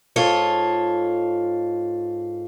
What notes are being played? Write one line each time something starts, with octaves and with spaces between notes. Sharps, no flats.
G#2 F4 A4 C#5